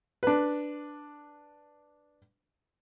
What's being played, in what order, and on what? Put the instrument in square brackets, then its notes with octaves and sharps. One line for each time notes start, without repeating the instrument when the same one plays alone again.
[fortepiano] D4 B4